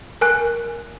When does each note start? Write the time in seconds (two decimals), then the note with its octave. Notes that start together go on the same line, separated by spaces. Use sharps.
0.21 A#4 G#5 F#6